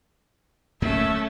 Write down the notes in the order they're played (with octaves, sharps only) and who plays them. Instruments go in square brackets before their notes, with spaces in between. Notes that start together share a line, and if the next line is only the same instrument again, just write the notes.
[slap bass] D1 F#2 A#3 [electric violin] A3 C#4 [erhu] E5